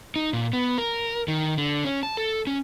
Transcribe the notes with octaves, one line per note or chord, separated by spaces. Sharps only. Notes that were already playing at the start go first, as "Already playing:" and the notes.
D#4
A#2
B3
A#4
D#3
D3
C#4
A5
A4
C#4